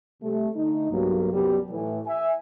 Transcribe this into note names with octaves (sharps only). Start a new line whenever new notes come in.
C3 G3 A3
D3 A3 D#4
B1 G2 F#3 A#3
C2 F#2 B2 G3
A2 E3
E5 G#5